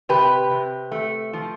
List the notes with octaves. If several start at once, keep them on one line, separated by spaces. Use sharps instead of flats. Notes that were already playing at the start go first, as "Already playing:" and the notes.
C3 G4 B4
C3
A3
F3